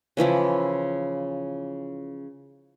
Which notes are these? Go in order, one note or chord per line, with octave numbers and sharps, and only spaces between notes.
C#3 E3 F3 E4